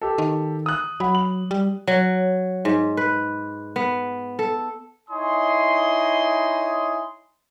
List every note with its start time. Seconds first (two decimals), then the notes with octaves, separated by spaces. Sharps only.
0.02 G4 A4
0.18 D#3
0.66 D#6 F#6
1.00 F#3 F#5 B5
1.15 F#7
1.51 G3
1.87 F#3
2.65 G#2
2.97 B4
3.76 B3
4.39 A4
5.10 D#4 E4 C#5 G#5 C6 D#6